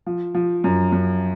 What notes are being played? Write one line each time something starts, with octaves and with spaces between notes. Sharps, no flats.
F3
F3
F#2
F#2